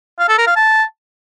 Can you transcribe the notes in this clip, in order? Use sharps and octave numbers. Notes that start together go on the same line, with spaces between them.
F5
A4
A#4
F5
A5